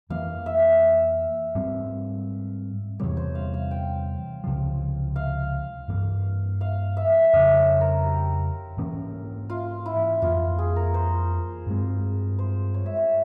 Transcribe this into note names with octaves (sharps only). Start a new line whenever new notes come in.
F2 E3 A#3 F5
E5
G#2 G3 C4
E2 C3 G3 C#5
C5
F5
F5
G5
C#2 C3 F3
F5
G2 E3 A#3
F5
E5
E5
F2 C#3 F3 C#5
C5
A#4
G4
G#2 E3 A#3 C#4
F4
E4
F2 E3 A#3 F4
G#4
A#4
C5
G2 E3 G#3 C4
C5
C#5
E5
C#5